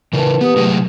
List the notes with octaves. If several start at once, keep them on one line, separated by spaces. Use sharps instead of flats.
C#3 E3 A#4 B4 A5
B3 G4 B4 D#6
C3 F#3 A3 G#4